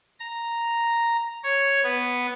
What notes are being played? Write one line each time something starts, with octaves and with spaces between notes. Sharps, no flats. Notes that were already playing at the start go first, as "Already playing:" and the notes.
A#5
C#5
B3